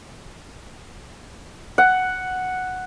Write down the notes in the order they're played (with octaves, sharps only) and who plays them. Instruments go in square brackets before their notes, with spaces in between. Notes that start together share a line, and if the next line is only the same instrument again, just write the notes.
[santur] F#5